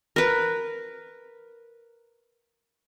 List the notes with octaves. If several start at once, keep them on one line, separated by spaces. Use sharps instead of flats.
A#4 B4